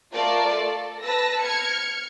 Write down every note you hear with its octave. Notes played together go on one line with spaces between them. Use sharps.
A3 F4 A#4 D5 A5
A4
B4 A5 E6 A#6
F6 G#6 C#7